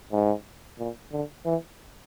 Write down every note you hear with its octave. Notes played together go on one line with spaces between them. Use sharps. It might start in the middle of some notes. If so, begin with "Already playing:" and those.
G#2
A#2
D3
E3